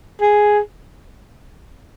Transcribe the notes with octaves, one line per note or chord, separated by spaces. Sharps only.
G#4